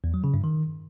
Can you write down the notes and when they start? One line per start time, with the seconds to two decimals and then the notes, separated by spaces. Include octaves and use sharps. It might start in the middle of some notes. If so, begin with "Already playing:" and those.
0.04 E2
0.14 F#3
0.24 C#3
0.34 G2
0.44 D#3